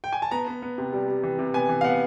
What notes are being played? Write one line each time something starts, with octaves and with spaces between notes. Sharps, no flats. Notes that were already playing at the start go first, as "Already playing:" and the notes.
G5
G#5
A5
B3 A#5
B3
B3
C3
G3
G3
E3
C3
B3 G#5
E3
F5
B3 F#5